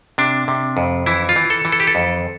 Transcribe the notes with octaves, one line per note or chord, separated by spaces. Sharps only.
C3 D4
C3
F2
E3 E4
F4
E3
A4
E3
A4
G4
A4
F2